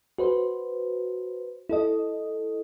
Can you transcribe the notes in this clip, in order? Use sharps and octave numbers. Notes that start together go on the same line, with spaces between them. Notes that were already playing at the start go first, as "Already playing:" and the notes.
F#4 B4 C5
E4 A4 D#5